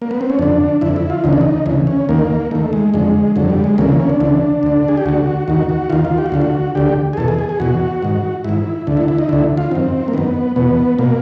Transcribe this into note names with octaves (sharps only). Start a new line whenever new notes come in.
A#3
B3
C4
C#4
F2 D3 D4
F2 D3 E4
E4
F4
D2 C#3 E3 D#4
D4
D#4
D2 C#3 E3
C#4
D#2 D#3 A#3
D#2 D#3 A3
G#3
F2 D3 G#3
F2 D3 F#3
G3
G#3
D2 C#3 E3 A#3
A#3
C#4
D4
D2 C#3 E3
D2 D3
G#4
G4
D2 D3 F#4
D#2 D#3 F#4
F#4
D#2 D#3 F4
F4
G4
F#4
D2 D3 F4
F#4
D2 D3 G4
G#4
E2 B2 A4
G#4
G#4
G#4
E2 B2 F#4
G#2 D#3
G#2 D#3 E4
D2 D3
E4
E4
D#4
D2 D3 E4
F4
F#2 D#3 C4
A#3
F#2 D#3 B3
E2 B2 B3
B2 A#3